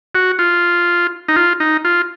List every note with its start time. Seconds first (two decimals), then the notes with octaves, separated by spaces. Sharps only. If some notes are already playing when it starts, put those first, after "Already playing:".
0.15 F#4
0.39 F4
1.28 D#4
1.36 F4
1.60 D#4
1.85 F4